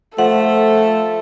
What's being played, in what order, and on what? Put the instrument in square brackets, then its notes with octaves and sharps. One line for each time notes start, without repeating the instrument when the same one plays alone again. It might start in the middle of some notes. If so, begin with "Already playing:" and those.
[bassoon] F3 [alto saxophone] A3 [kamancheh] A4 [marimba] F#5